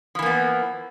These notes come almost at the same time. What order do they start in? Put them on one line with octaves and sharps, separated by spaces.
F3 E3 A#3 B3